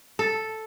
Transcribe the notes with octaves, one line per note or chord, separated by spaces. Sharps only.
A4